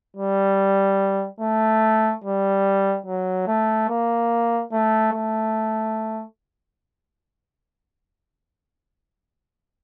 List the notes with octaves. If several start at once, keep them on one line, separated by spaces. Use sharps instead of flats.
G3
A3
G3
F#3
A3
A#3
A3
A3